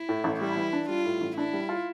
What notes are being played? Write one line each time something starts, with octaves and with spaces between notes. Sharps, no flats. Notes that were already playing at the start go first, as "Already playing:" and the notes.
Already playing: E4
A2
A1
G3 E4
E3
D4
G3 F4
A2
A1
D4 E4
G3
F4